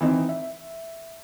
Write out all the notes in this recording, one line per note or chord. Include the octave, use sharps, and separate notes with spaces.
E3 C4 D#4
E5